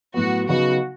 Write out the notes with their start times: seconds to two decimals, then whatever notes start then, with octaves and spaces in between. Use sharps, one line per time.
0.14 A2 F#3 B3 F#4
0.48 C#3 F#3 B3 D#4 F#4